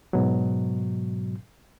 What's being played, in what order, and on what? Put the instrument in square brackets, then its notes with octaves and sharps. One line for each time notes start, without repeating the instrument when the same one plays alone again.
[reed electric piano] G#2 B2 F#3